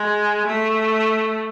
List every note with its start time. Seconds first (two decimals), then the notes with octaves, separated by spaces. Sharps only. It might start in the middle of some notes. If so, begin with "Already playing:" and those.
Already playing: G#3
0.47 A3